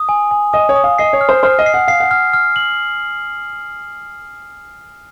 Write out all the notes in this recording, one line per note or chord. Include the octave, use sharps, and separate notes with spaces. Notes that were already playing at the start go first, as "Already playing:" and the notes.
Already playing: D#6
G#5
G#5
D#5 D#6
C#5
D#6
F5
D#5 C7
C#5
F6
C5
C5 F6
D#5
C7
F#5
F5 C7
F#5
F6
F6
F#7